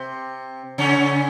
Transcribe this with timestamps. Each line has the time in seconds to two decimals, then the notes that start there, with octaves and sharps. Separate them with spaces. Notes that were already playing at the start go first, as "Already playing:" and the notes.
Already playing: C3 C4
0.78 C#3 C#4